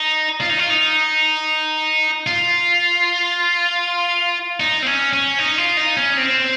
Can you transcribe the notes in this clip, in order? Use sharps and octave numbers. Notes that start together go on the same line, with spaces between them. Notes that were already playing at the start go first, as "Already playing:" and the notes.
Already playing: D#4
F4
D#4
F4
D#4
F4
D#4
C4
C#4
C#4
D#4
F4
D#4
C#4
C4